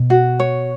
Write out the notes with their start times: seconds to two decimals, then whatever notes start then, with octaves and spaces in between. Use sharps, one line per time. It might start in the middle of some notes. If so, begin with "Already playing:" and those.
Already playing: B2
0.10 F#4
0.40 C#5